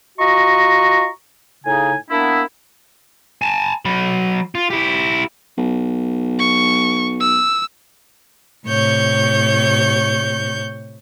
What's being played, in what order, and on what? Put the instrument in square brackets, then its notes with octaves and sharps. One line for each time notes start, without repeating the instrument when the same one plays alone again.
[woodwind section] F4 F#4 D#5 A#5 C#6
A2 C#3 D#4 G#5
A#3 B3 D4 E4
[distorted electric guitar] G#5 A5
F#3 B5
F4
E4 G4
[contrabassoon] B1
[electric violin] C#6
E6
[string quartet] A2 C3 C#5 C#6 G6